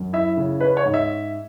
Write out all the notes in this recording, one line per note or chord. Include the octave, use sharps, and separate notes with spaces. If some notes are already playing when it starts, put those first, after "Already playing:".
Already playing: F#2
E4 E5
C#3
C#4 B4
C#5
G#2
E5